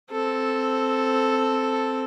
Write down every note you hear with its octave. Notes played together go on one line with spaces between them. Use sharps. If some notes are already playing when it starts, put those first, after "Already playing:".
C4 A4